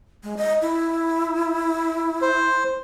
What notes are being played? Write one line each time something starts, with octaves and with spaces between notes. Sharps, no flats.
G#3
D#5
E4
C5